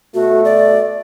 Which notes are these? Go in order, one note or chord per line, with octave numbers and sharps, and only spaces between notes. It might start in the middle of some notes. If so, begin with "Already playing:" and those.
B2 A3 F#4
D5